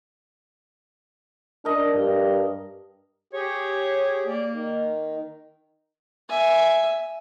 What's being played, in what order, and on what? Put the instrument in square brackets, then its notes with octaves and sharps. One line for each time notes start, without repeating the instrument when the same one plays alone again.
[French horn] D4 [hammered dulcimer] A#4 D#5
[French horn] G2
[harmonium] G4 G#4 [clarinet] C#5
[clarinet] A#3 [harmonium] D5
[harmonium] D#3
[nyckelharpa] E5 G#5